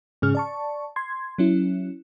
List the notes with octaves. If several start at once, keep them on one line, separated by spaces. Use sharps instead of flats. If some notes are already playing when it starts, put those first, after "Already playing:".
G#2 C#3 C#4 G#4 F6
D5 A5 C#6
C6 G#6
F#3 C#4 E4